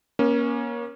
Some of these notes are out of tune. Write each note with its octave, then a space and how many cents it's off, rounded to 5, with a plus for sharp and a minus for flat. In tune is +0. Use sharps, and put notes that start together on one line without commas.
A#3 +30 C#4 +0